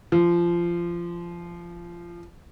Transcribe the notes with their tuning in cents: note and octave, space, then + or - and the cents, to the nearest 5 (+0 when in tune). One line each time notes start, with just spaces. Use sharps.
F3 -20